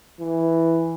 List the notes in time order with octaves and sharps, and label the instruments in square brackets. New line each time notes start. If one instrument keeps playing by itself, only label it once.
[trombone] E3